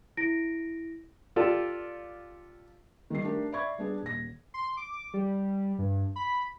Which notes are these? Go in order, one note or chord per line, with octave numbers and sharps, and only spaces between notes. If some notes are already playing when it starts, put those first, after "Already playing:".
E4 A#6 D7
F4 G4 A4 D5
D#3 G3 C7
A3 D4 G4 A#4
D5 E5 B5 C#6 G#6
G3 B3 D4 G#4 D5
D#1 A#6
C6
D6
G3
G2
B5